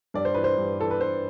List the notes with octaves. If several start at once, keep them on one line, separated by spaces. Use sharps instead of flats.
G2 D5
C5
E3 B4
C5
G2
E3 A4
B4
G2 C5